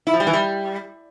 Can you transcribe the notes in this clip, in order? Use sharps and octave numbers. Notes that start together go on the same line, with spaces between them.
E4
F3
G3
E3
G3